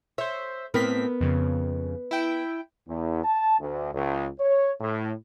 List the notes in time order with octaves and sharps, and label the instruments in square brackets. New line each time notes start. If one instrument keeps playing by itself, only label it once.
[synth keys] C5 E5 [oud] C#5
[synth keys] A2 C4 B6 [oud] B3 A#4 B4
[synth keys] F2 C#3
E4 G5
[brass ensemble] E2
A5
D2
C#2
C#5
A2